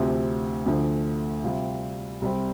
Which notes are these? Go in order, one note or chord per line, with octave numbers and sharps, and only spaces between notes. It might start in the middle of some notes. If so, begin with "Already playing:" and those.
Already playing: D2 C3 F3 C4
D2 D3 F3
C3 G3 F4
C2 C3 G3 C4